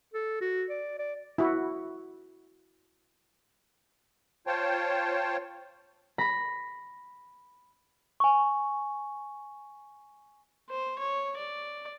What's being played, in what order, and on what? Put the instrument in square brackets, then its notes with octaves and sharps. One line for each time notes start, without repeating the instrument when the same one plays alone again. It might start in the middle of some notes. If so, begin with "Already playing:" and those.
[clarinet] A4
F#4
D5
D5
[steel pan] E4 F#4
[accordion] F4 C5 C#5 G5 A5
[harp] B5 A#6
[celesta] G#5 C#6
[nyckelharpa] C5
C#5
D5